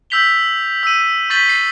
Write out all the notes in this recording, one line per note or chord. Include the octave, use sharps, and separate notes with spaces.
E6 G6 B6 F7 G7
E6 D#7
C#6 G6 A6 B6 F#7 G7
C7